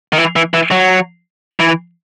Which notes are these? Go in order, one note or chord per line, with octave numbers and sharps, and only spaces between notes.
D#3
E3
E3
E3
F#3
E3